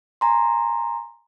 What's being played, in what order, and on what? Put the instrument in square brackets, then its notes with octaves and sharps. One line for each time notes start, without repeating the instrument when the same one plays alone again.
[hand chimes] G#5 A#5 C6